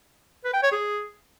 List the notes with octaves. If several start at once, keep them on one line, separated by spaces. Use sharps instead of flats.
B4
G5
C#5
G#4